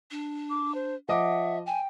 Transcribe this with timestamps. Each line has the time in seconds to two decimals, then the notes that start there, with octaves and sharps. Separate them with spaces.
0.11 D4
0.50 D6
0.75 C5
1.09 F3 D#5 E5 F#5 D6
1.67 G5 G#5